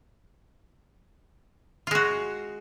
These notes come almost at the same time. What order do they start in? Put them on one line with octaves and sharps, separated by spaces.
F4 G#3 F#4